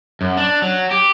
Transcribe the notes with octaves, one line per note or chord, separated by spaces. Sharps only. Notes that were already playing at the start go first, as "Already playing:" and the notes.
F#2
D4
F#3
G4